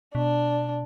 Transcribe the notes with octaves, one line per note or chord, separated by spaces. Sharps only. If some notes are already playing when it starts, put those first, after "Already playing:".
B2 D4